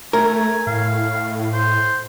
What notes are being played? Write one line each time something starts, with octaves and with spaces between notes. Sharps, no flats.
A3 A#4 G#5
A2 F5
C5